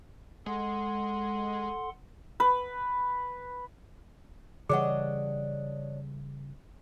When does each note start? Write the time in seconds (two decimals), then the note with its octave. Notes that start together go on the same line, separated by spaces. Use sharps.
0.46 G#3 A4 F#5 C6
2.40 B4
4.69 C#3 E3 G3 D4 G#4 C#5 D#5 F#5